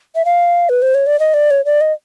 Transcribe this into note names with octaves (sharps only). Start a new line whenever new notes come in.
E5
F5
B4
C5
C#5
D5
D#5
D5
C#5
D5
D#5